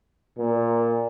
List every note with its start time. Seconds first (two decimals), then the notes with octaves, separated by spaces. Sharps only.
0.39 A#2